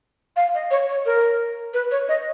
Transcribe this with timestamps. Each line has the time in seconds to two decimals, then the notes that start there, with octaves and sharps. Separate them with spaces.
0.36 F5
0.55 D#5
0.71 C#5
0.89 C#5
1.06 A#4
1.74 B4
1.91 C#5
2.09 D#5